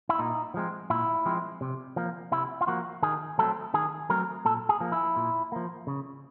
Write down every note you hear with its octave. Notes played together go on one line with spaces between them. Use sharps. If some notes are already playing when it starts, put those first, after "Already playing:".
E4
A#2 D#4
F3 G#3 C4
A#2 E4
F3 G#3 C4
C3
F3 A#3
C3 E4
F4
F3 A#3 F#4
D#3 G#4
F#3 A3 C4 A4
D#3 G#4
F#3 A3 C4 A#4
A#2 A4
G#4
F3 A#3
E4
A#2
F3 A#3
C#3